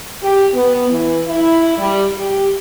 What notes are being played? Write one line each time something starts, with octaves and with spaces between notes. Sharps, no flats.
G4
B3
E3
E4
G3
G4